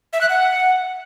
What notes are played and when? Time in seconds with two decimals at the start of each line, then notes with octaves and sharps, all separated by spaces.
0.13 E5
0.21 F#6
0.29 F#5